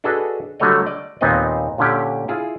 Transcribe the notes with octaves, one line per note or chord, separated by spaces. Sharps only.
D4 F#4 G#4 A4 B4 D#5
D3 F#3 G3 A3 C#5 D#5
D5 D#5
D#2 A#2 B3 C4 D#4 D#5
A#2 D3 C#4 G4
E4 F4 G#4